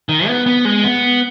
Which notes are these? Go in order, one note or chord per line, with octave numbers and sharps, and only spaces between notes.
D#3
B3
B3
G#3
B3